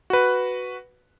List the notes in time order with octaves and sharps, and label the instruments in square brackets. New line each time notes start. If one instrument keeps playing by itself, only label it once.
[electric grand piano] F#4 B4